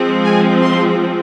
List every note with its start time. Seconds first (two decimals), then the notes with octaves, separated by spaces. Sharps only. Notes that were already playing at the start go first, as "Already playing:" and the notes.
Already playing: F3 G#3 C4
0.24 G#5
0.62 C6